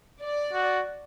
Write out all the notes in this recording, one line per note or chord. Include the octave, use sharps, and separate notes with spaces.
D5
F#4